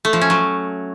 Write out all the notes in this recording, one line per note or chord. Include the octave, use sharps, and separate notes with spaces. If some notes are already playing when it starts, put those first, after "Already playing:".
A3
F3
C#4
F#3